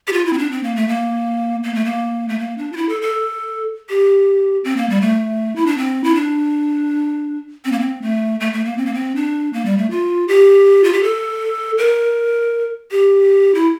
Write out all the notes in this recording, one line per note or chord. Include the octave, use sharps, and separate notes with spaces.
G4
F4
E4
C4
D4
C4
A#3
A3
A#3
A#3
A3
A#3
A3
A#3
D4
F4
E4
A4
A4
G4
C4
A#3
G3
A3
E4
D4
C4
E4
D4
C4
A#3
C4
A3
A3
A3
A#3
C4
A#3
C4
D4
A#3
G3
A3
F4
G4
F4
G4
A4
A#4
G4
E4